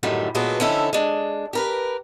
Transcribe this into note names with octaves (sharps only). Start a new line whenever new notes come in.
F#2 A2 D3 D#3 G3
A#2 F#3 G#3 A3 B3
D3 F3 C#4 D#4 E4 A4
G#3 D4
G4 A#4 B4